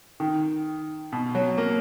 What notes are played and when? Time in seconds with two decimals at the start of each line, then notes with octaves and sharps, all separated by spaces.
0.20 D#3
1.12 B2
1.35 F#3
1.58 A#3